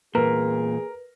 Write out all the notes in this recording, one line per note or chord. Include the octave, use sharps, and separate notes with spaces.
E2 A#2 G#4 A#4 B4